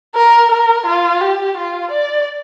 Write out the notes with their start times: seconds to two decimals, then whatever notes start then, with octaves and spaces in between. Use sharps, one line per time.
0.15 A#4
0.51 A#4
0.86 F4
1.21 G4
1.57 F4
1.91 D5